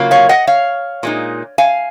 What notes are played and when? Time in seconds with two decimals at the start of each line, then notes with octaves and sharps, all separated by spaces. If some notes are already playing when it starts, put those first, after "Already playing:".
Already playing: C#3 F#3 A#3 F4
0.11 C#5 F5
0.29 D#5 F#5
0.47 C#5 F5
1.03 A#2 G#3 D#4
1.58 F5 G#5